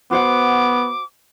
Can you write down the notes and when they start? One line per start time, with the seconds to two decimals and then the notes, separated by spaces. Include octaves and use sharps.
0.11 B3 F#4 C5 F#5 D6